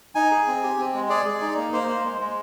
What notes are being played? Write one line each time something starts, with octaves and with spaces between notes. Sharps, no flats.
D#4 G#5
G#4
C4
G4
C4
G#3
G#4 D5
G#4
D#4
A#3
A#3 C5
A#3
G#3
G#3